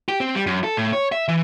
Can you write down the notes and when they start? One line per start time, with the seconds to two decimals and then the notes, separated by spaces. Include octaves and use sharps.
0.09 G4
0.20 C4
0.35 G3
0.46 F#2
0.64 A4
0.77 A2
0.93 C#5
1.12 E5
1.28 E3